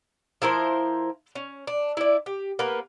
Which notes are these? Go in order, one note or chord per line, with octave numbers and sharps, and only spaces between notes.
F3 E4 A#4 C5
C#4
D4
E4 D5
G4
A#3 B3 B4